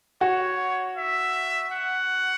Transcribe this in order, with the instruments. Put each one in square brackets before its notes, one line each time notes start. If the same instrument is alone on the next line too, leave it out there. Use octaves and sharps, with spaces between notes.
[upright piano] F#4 [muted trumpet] C#5
[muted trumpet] E5
F#5